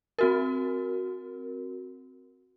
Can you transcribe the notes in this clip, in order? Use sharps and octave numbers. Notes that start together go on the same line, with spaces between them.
C4 F#4 A#4